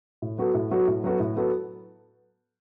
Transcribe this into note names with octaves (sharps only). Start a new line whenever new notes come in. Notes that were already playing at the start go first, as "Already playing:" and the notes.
A2
F#3 B3 F#4 A4
A2
F#3 B3 F#4 A4
A2
F#3 B3 F#4 A4
A2
F#3 B3 F#4 A4